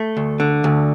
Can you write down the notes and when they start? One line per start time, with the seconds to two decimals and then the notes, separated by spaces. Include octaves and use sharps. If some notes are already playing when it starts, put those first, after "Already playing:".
Already playing: A3
0.17 D2
0.40 D3
0.64 D2